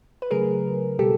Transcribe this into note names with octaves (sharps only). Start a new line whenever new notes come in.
B4
C#3 F#3 A3 G#4 A#4
B2 G3 G4 A4